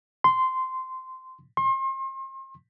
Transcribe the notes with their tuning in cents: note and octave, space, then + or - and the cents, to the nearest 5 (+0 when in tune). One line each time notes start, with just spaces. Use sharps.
C6 -15
C6 +35